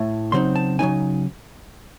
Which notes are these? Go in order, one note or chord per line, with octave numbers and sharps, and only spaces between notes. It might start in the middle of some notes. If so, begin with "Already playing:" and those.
Already playing: A2 A3
C#3 F#3 C4 D#4 C6
A5
C#3 F#3 C4 D#4 G#5